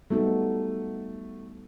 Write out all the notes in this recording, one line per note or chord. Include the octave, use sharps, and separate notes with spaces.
G3 A3 B3 D#4 F#4 A4